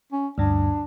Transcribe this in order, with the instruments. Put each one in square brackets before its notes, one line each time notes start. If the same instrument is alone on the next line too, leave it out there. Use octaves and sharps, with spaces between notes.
[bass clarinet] C#4
[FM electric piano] D2 G2 [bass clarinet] D4